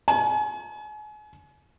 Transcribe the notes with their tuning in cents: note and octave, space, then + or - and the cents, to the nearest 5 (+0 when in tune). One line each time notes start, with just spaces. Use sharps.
G#5 +35